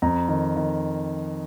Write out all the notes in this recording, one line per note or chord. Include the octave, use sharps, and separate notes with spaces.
F2 A#5
D#3
D#3